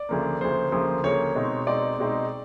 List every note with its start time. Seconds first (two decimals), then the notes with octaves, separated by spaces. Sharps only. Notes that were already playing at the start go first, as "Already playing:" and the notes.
Already playing: D5
0.09 D2 C#3 F3 A#3
0.41 D2 C#3 F3 A#3 C5
0.72 D2 C#3 F3 A#3
1.04 D2 C#3 F3 A#3 C#5
1.35 B2 G#3 C4 D#4
1.67 B2 G#3 C4 D#4 D5
1.99 B2 G#3 C4 D#4